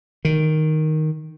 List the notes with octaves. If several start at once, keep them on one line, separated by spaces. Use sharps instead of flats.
D#3